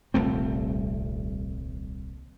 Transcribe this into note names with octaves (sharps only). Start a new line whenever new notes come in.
D#1 C2 A3 C4